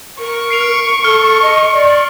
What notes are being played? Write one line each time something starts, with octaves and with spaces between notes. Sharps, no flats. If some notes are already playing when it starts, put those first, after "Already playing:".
A#4 C#6
C7 D7 F7
A4 F6
D#5
D5